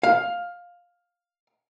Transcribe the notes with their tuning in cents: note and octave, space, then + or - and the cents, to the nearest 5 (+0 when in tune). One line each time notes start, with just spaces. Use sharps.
F5 +10